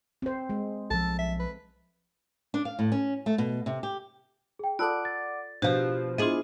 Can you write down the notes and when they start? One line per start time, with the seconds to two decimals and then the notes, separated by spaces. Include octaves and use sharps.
0.22 C4 C5
0.49 G#3
0.90 B1 F3 A4 A5
1.19 E5
1.40 B4
2.54 D4
2.65 F5
2.79 A2
2.92 C#4
3.26 A3
3.38 B2
3.66 C3
3.83 G4
4.59 G#4 G5
4.79 F4 A4 D5 F#5 A5 D6 E6 F#6
5.05 A6
5.62 B2 F3 D4 F#4 G4 C5 F5
6.18 B3 D4 E4 F4 G#4 D#5 C6